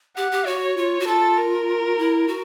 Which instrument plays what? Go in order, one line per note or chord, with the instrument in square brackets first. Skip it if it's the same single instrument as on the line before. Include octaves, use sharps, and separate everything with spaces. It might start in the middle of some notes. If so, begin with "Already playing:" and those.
[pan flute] G4 [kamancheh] F#5
[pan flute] G4
[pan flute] F#4 [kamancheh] C#5
[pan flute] F4
F#4
[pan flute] F4 [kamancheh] A4
[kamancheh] A#4
[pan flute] E4
F#4